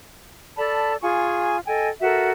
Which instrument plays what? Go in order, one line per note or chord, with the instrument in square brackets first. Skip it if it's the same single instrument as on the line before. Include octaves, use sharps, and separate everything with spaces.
[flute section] A4 D5 A5 B5
F4 G#4 G#5 C#6
A4 D#5 G5 G#5
F#4 A4 A#4 E5